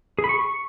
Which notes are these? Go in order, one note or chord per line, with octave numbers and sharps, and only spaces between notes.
G#4
B5
C#6